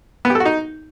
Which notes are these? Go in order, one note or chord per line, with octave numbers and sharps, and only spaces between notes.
B3
G4
A4
F#4
D#4